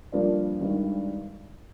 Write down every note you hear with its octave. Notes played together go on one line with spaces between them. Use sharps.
G2 F3 A#3 D4 F4
G#1 G2 D#3